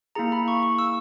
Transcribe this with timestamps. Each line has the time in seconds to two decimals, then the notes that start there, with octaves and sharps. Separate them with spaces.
0.15 A#3 E4 G#4 A#5
0.32 B5
0.48 C#6
0.63 C#6
0.78 E6